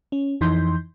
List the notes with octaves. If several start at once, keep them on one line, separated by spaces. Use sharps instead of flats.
C#4
F2 E3 D#4 C6 G6